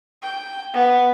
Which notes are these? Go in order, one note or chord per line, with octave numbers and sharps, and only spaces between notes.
G5
B3